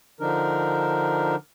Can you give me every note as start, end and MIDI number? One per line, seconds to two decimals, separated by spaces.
0.20 1.35 50
0.20 1.35 53
0.20 1.35 62
0.20 1.35 63
0.20 1.35 70